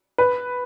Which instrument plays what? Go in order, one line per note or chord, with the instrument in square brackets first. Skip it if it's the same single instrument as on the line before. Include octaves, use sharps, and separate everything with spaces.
[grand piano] B4